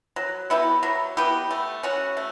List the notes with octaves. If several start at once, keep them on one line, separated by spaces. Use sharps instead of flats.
F#3
B3 E4 G4
F#3
B3 E4 G4
A3
C#4 F#4
A3